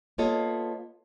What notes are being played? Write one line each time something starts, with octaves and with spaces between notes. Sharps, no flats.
A#3 B3 F4 A4 C#5 D#5